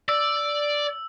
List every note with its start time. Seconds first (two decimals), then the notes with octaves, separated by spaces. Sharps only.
0.09 D5 E6